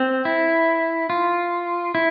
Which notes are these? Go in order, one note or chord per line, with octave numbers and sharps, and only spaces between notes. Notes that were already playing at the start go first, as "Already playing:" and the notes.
Already playing: C4
E4
F4
E4